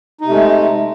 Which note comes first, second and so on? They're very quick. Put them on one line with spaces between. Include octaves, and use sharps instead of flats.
D#4 C3 A3 G#3